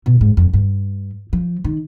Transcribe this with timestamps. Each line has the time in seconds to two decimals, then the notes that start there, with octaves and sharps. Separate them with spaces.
0.06 B2
0.21 G#2
0.37 F2
0.53 G2
1.33 F3
1.64 D#3